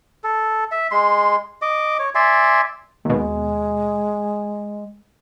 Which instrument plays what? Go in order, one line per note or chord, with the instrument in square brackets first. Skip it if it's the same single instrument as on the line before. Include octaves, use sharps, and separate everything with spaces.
[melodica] A4
E5
G#3 C6
D#5 D6
C#5
D5 E5 G#5 C6
[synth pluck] D#2 B2 [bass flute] G#3